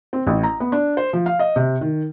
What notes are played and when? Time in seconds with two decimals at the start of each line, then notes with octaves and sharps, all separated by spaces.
0.13 C4
0.27 A1
0.43 A#5
0.60 B3
0.72 D4
0.97 C5
1.13 F3
1.26 F5
1.39 D#5
1.56 C3
1.81 D#3